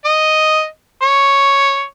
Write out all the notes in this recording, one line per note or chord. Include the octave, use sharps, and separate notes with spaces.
D#5
C#5